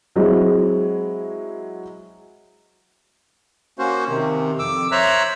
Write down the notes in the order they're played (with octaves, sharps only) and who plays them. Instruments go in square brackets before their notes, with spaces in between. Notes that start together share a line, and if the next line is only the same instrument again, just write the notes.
[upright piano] F#3 G#3 C4 E4
[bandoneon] A#3 C#4 F#4 C5
C3 D#3
F2 D6 E6
C5 C#5 E5 A#5 E6 F#6